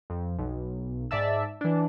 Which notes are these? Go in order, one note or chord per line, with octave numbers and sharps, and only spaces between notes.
F2
B1
G#2 D5 E5 A5 E6
E3 D4